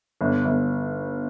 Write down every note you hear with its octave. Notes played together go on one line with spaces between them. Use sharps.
G1
G1